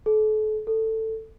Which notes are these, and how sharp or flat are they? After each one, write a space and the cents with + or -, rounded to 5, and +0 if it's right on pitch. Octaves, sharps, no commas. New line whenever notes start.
A4 -35
A4 +15